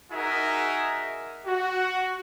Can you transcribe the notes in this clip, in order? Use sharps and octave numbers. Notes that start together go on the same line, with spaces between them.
D#4 F#4 G#4 A#4 E5 G#5
F#4